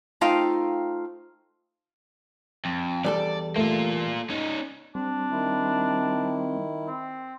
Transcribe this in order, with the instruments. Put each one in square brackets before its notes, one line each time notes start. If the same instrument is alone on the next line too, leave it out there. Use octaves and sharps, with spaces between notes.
[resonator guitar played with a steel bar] A3 D#4 F4 C5 F5 G5
[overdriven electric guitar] F2
[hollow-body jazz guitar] E2 G3 A4 [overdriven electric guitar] D5
[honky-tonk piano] A3 [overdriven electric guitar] A#3 F4
[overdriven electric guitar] C#4 D#4
[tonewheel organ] G3 C4 [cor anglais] D4
[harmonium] D#3 E4
[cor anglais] C4